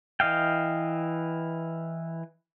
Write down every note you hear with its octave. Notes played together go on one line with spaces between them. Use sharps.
E3 D#5 F5 G5